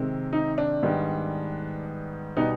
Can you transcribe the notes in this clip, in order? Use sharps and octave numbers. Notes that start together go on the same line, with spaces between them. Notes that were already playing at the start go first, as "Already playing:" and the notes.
Already playing: C3 D#3 G#3 C4
D#4
D4
G#2 D#3 G3 B3
B2 G3 B3 D#4